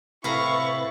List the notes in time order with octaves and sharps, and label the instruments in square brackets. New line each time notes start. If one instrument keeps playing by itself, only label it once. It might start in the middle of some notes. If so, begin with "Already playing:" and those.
[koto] A2 F5 A#5 [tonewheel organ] C3 B4 A6 [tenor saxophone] E4 [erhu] C#6